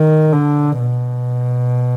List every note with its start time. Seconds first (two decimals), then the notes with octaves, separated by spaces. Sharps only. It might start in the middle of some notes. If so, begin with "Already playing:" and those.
Already playing: D#3
0.33 D3
0.80 B2